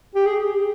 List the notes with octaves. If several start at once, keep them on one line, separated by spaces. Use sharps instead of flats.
G4
G#4